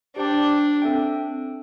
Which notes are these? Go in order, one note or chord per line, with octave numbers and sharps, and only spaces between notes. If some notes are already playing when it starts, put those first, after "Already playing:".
D4 G4 C5 G5
C4 A4 E5 G5